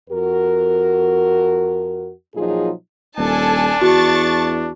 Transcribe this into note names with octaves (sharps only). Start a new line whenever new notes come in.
F2 F#4 A#4
A#2 F3 F#3 D#4 F4 G#4
D#1 D4 A4 G#5 A5
E2 F#4 A5 C#6 A6